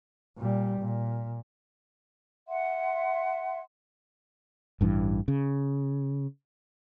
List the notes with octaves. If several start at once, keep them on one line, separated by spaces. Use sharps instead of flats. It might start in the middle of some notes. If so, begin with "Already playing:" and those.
A#2 G3
A#2
E5 F#5 C6
A1 G2 C3 E3
C#3